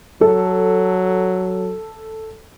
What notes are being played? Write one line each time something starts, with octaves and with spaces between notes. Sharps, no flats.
F#3 A4